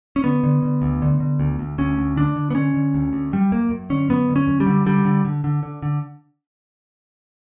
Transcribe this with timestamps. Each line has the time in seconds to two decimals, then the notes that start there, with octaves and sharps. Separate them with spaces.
0.16 C#4
0.24 D3 B3
0.43 D3
0.62 D3
0.82 D2
1.02 D3
1.20 D3
1.40 D2
1.59 D2
1.78 D2 C#4
1.97 D2
2.17 D3 D4
2.36 D3
2.50 B3
2.55 D3 C#4
2.74 D3
2.94 D2
3.13 D2
3.33 F#2 G3
3.52 F#2 A#3
3.70 F#2
3.90 D3 C#4
4.09 F#2 B3
4.29 D3
4.36 C#4
4.48 F#2
4.60 G3
4.67 D3
4.86 D3 G3
5.05 D3
5.25 D3
5.44 D3
5.63 D3
5.83 D3